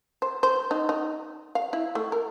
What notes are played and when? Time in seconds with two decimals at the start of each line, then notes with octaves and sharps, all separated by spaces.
0.22 C5
0.43 C5
0.71 D#4
0.89 D#4
1.55 F5
1.73 E4
1.95 A3
2.12 A#4